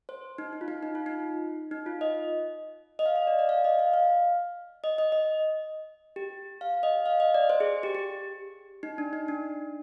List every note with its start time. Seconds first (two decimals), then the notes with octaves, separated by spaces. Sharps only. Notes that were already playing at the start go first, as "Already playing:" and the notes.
0.09 C5
0.38 D#4
0.53 D#4
0.61 F4
0.68 D#4
0.83 D#4
0.95 F4
1.06 D#4
1.71 D#4
1.86 F4
2.01 D#5
2.99 D#5
3.06 F5
3.16 D#5
3.27 D5
3.39 D5
3.49 F5
3.64 D#5
3.79 F5
3.94 F5
4.84 D#5
4.98 D#5
5.12 D#5
6.16 G4
6.61 F5
6.83 D#5
7.06 F5
7.20 D#5
7.34 D5
7.50 C5
7.60 G#4
7.83 G4
7.95 G4
8.83 D#4
8.98 D4
9.13 D#4
9.28 D4